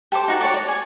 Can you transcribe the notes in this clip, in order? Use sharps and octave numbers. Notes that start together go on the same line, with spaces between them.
G4 A4 C5 D6
D#4 F#4 A4
C#5 D5 D6
D5
G#4 G#5